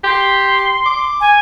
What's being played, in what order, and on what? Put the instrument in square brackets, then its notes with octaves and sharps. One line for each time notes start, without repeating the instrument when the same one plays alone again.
[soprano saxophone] G4 [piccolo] C6
[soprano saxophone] D6
[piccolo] G#5